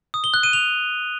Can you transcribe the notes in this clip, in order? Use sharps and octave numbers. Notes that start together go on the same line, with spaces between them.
D#6
G7
F#6
D#7
F7